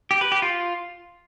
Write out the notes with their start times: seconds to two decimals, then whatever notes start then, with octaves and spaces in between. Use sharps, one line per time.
0.11 G4
0.21 B4
0.32 G4
0.42 F4